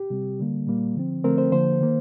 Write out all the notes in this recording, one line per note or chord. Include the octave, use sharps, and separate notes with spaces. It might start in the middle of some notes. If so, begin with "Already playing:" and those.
Already playing: G4
C3 G3 C4
D3 G3 A#3
A#2 G3 A#3
D3 F3 C4
D3 F3 A3 C4 A#4
C5
D3 F3 A#3 C5
D#3 A#3